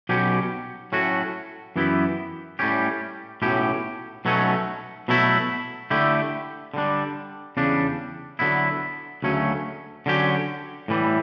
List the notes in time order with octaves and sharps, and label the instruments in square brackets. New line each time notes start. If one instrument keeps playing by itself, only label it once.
[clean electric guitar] B1 B2 F#3 C#4 G4
A2 F#3 A3 C#4 F#4
F#2 E3 B3 E4 G4
A2 G3 C#4 G4
B1 A2 F#3 C#4 G4
B1 B2 F#3 A3 C#4
B2 F#3 A3 E4
D3 A3 E4 G4
D3 G3 D4
E2 C#3 G3 D4
D3 F#3 B3 E4
D2 C#3 F#3 A3 C#4
D3 F#3 C#4 G4
A2 E3 G3